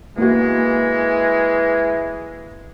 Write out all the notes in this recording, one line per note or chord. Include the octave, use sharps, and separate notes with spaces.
E3 G#3 A#3 F#4